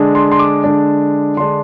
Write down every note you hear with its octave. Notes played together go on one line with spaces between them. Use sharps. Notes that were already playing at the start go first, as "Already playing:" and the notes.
Already playing: D3 G#3 D4
C6
C6
D6
D3 G#3 D4
D3 G#3 D4 C6